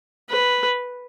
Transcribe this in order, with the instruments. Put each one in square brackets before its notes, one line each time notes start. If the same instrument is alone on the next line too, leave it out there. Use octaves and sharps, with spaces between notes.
[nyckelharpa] B4